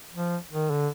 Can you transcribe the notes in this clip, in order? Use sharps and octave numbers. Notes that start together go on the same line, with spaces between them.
F3
D#3
D3